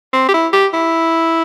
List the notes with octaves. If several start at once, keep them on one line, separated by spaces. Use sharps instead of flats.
C4
G4
E4
G4
E4